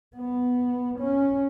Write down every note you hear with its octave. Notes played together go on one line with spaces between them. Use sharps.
B3
C#4